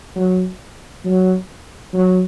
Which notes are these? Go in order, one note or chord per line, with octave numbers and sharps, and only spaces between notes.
F#3
F#3
F#3